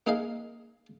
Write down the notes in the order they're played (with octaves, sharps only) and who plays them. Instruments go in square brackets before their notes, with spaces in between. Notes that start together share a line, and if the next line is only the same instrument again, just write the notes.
[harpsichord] A#3 D#4 G#4 D#5 F5